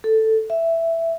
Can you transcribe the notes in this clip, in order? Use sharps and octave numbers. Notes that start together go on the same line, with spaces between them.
A4
E5